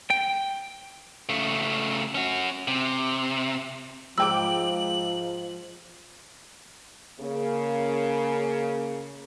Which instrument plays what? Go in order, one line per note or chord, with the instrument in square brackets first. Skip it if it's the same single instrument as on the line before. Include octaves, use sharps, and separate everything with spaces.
[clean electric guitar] G5
[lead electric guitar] C#3 A3
C#4 F#4
C3
[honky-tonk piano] G#2 G5 D6 [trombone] F3 [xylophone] E6 [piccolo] F#7
[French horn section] C#3 A#3